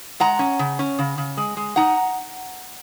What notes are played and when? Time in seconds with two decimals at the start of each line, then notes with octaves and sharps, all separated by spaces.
0.20 G#3 F#5 A#5
0.39 C#4
0.59 C#3
0.79 C#4
0.99 C#3
1.18 C#3
1.37 G#3
1.57 G#3
1.76 D#4 F#5 A#5